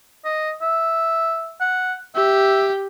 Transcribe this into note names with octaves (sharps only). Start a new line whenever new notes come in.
D#5
E5
F#5
G4 E5